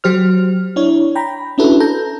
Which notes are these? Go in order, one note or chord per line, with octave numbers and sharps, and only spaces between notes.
F#3 G4 C5 F6
D4 E4 C#5
G5 A#5 B5
C#4 D4 E4 F#4 A4 B4
A4 A#5 G6